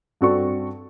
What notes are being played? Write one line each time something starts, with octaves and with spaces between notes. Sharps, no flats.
G2 C4 F#4 A4 D5 C#6